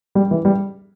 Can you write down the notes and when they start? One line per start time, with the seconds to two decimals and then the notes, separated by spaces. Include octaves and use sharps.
0.15 G3
0.31 E3
0.45 G3